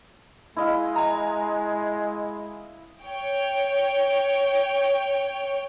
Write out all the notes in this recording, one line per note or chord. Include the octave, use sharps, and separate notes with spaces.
G#3 E4 D#5 F5
G#5 A#5
C#5 G5